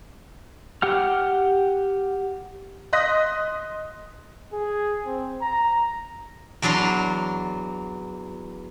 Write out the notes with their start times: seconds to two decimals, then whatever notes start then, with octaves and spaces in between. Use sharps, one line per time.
0.82 G4 F#5 F6
2.93 D#5 C6 D#6 F#6 A#6 B6
4.53 G#4
5.06 C4
5.41 A#5
6.62 E2 F#3 D4 A#5 C6